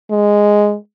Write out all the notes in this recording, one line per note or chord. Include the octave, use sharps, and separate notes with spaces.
G#3